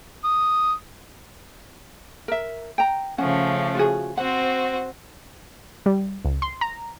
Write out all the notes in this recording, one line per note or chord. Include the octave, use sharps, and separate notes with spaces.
D#6
A#4 E5
G5 A#5
C#3 F3 A3 C#4 F#5
F4 F#4 G#4
C4 F#4 C5 F#5
G3
C#2
C6
A#5